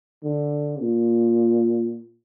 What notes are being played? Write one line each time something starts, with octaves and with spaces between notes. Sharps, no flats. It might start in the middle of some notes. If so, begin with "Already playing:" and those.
D3
A#2